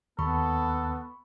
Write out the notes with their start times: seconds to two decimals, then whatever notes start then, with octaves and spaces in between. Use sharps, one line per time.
0.19 D#2 B3 A4 B5 C#6